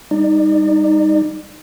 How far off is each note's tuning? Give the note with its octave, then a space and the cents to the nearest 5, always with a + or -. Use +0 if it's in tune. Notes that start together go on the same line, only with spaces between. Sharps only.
G3 +25 D#4 +0 D5 +30